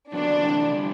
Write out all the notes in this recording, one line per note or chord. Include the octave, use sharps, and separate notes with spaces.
F2 D3 F#3 B3 D4
C3 E3 A3
D3 G3